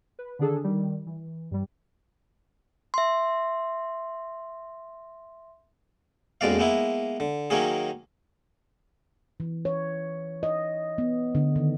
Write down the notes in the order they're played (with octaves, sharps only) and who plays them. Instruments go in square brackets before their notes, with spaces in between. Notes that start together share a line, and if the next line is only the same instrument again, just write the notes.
[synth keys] B4
D3 D#3 D4 G#4 A4
D#3 G3
E3
G2 G3
[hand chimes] E5 C6
[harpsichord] A#1 F2 B2 G#3 D5 F5
G#3 A#3 B3 E4
D3
D#3 F#3 A#3 C#4 G#4
[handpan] E3
C#5
D#5
B3
D3
D#3